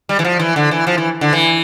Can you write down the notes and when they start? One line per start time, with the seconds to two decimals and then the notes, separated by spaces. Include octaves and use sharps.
0.09 G3
0.19 E3
0.24 F3
0.39 E3
0.56 D3
0.71 E3
0.87 F3
0.98 E3
1.21 D3
1.33 E3